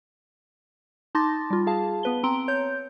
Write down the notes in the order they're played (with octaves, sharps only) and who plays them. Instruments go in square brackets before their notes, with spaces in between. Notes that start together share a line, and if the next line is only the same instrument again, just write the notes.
[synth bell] D#4 A5 C6 D6 A6 A#6
G3 F4
G#4 F5 A5
B3 B4 G7
C4 A#5 C6 D7 G7
C#5 G6